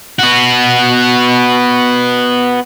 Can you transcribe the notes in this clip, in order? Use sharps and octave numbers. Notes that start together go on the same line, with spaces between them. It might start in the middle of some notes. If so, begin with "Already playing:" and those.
B3 F#4